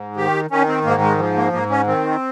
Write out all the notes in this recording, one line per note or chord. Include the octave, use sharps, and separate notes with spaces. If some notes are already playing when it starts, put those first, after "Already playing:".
Already playing: G#2
D#3 G4
D#3 C#4
C4
G#2 A#3
G#3
F3
A#3
G#2 A#3
C#4
D#3 C4